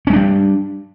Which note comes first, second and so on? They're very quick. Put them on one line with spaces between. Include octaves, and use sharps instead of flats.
C#4 G#3 D4 G3